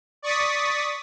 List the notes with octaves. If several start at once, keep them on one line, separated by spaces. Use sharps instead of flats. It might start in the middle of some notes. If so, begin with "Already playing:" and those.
D5 C#6 D#6 A6 B6